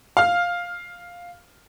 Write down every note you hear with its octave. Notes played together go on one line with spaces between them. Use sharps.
F5 F6